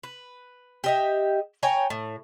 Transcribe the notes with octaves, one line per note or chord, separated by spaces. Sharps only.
B4
G4 D#5 E5
C#5 G5 G#5 A#5
A2